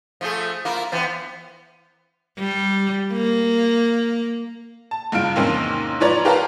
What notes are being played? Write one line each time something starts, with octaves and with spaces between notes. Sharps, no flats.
F3 A3 G#4
A#3 E4 F4
E3 B3 C4
G3
A#3
A5
F#1 G2 F4 D7
E2 G#2 C3 D#3 A#3 C#4
G#2 F3 B4 C#5 D5 A#5
G4 A#4 B4 F5 A5 A#5